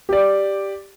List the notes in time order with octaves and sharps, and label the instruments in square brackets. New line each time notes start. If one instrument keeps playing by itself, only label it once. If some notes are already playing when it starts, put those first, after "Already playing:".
[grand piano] G4 D5